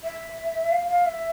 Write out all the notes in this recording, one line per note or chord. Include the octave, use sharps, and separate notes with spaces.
E5
F5
F5
E5